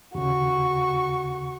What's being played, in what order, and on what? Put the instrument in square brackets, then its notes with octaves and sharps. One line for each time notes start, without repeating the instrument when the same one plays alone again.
[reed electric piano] D#2 C#3 [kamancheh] F#4 C#6